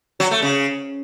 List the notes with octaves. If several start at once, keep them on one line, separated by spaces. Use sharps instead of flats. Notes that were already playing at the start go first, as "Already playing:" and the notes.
F#3
A3
C#3